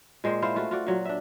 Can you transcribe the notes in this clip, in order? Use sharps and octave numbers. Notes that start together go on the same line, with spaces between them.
A#2 G#3 C5 G5
E4 F4 C5
A3 F4 F#4
F4 F#4 D5
A#2 F#3
D4 E5